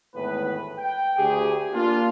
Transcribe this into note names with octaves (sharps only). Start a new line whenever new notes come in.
G#1 E2 A2 B3 B4
G5
D2 G4 G#4
A#3 D4 F4